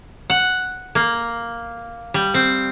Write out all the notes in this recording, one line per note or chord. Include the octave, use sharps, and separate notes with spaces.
F#5
A#3
G3
C4